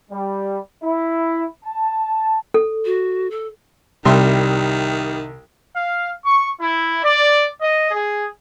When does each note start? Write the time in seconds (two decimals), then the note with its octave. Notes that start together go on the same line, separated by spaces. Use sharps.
0.11 G3
0.83 E4
1.65 A5
2.54 A4
2.85 F#4
3.31 A4
4.05 C2 C3 D#3 G3 E5 C6
5.75 F5
6.25 C#6
6.60 E4
7.02 D5
7.60 D#5
7.91 G#4